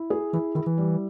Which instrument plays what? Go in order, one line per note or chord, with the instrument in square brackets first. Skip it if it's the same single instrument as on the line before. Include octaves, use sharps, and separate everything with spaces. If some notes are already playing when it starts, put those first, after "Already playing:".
Already playing: [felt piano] E4
G#4
[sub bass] E3 [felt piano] E4
[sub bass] D#3 [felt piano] E4
[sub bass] E3
[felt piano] G3